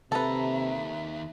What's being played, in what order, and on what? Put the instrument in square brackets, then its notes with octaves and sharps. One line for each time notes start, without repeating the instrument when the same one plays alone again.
[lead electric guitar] D#2 A#5 [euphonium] C3 [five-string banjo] A4 B4 [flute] E5